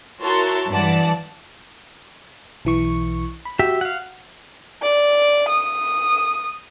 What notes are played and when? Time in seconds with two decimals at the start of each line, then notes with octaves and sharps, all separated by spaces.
0.22 E4 F#4 A#4 C#5 A5 C6
0.71 G2 E3 D5 F#5 A5
2.65 B1 E3 C#6
3.45 B5
3.59 F#4 G4 E5
3.81 F5 F#5
4.82 D5
5.49 D#6